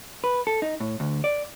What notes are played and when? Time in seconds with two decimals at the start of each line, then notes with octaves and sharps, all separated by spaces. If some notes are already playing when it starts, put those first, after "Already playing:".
0.24 B4
0.47 A4
0.62 D#4
0.80 A2
1.00 D2
1.24 D5